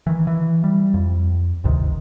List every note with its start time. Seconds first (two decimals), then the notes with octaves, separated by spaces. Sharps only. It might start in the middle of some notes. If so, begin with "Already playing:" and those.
0.07 D#3 E3
0.27 E3
0.64 G3
0.94 F2
1.64 G1 D2 C3 D#3